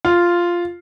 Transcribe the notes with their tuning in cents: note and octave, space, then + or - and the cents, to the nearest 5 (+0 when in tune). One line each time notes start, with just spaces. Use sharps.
F4 -5